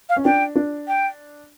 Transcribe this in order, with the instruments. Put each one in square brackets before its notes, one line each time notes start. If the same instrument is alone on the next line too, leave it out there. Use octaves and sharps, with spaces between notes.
[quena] F5
[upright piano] C#4
[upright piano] D4 [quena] G5
[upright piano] D4
[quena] G5